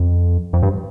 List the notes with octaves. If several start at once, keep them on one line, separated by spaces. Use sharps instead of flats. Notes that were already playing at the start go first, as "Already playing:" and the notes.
Already playing: F2
F2
G2